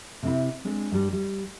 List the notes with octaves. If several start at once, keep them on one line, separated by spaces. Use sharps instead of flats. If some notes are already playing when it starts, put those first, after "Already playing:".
C3 C4 E4
G#3 C4 D4
G2 G3
G3